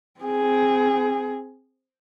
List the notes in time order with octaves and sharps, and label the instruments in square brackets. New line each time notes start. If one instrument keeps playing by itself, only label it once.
[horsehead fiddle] C4 G#4